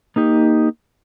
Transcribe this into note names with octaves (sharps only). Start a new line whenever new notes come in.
A#3 D#4 G4